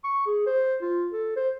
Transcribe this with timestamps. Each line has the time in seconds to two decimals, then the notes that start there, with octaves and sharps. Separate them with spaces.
0.04 C#6
0.26 G#4
0.46 C5
0.82 F4
1.12 A4
1.36 C5